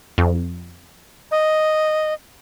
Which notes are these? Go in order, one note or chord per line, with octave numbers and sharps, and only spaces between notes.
F2
D#5